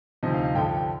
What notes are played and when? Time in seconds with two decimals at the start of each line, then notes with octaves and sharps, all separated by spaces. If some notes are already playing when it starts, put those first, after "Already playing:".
0.23 D2 C3 F3 C4 D#4 D#5
0.34 F5
0.44 F5
0.55 G2 D3 F3 G5
0.77 G5